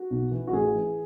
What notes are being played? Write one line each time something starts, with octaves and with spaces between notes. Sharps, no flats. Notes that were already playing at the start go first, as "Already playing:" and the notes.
Already playing: F#4
B1
E3
F#4
A1 G#4
E3